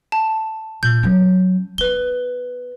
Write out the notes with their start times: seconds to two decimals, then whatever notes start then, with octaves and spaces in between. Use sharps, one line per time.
0.12 A5
0.83 A#2 G6
1.03 F#3 C#4
1.78 B3 B4 G7